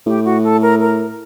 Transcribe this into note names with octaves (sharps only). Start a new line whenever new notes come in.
A2 G4
F#4
A4
A#4
A#4